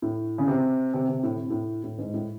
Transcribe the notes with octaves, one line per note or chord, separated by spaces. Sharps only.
A2
C#3
C3
C3
C3
A2
C3
A2
A2
G#2
A2